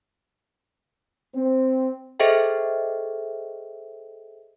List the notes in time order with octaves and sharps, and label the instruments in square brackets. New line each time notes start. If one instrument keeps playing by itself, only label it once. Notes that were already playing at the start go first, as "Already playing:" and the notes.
[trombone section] C4
[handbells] G#4 A4 C5 D#5 E5 G5